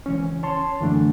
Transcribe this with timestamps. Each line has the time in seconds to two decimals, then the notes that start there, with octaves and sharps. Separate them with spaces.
0.06 C#2 E3 C#4
0.43 C#5 A5 C6
0.80 F#2 D3 E3 A3 D4